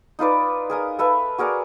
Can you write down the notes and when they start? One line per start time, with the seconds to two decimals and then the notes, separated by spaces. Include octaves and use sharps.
0.19 D#4 F4 B4 D5
0.70 G#4 A#4 D#6
0.99 A4 B4 E5 F5
1.38 F#4 G#4 A#4 D5